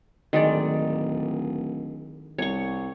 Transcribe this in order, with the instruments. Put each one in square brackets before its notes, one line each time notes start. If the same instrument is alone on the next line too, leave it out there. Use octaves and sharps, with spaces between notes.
[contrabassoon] D1 [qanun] D#3 G#3 D5
[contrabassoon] C2 [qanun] C#5 C#6